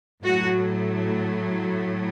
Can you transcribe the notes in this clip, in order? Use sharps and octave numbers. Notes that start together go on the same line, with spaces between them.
A2 F#3 A3 F#4